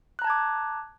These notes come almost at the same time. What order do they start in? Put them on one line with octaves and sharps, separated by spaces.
F#6 A#5 A5 G#6 D6